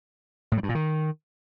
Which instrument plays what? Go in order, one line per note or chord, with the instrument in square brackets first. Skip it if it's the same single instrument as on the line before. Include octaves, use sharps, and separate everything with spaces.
[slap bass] A2
G3
G2
A#2
D#3